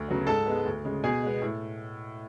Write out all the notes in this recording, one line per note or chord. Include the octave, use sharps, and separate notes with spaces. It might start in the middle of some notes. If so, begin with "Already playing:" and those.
Already playing: D2
C#3 F#3 B3
G#2 A4 A5
G#3 B3
D2
C#3 G#3
B2 G#4 G#5
G#3 B3
A2